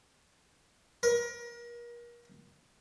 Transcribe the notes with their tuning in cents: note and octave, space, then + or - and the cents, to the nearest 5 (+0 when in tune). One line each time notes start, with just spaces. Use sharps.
A#4 +35